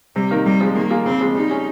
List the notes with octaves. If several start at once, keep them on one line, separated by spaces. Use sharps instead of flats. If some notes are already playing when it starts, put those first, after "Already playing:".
C3 G3
D#3 A#3 D#4 A#4
C3 G3
F3 G#3
D#3 A#3
A#3 F4 G#4
C#3 C4
F3 G#3
G3 D#4
C#4 G#4